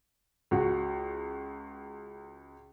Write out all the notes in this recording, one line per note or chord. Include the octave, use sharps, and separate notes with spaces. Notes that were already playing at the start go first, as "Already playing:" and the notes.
C#2 F#4